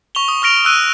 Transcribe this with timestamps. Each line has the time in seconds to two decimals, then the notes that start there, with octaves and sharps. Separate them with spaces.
0.15 C#6 F7 G7
0.28 D#6
0.42 C#6 F6 A#6 D7 F7
0.65 E6 F#6 D#7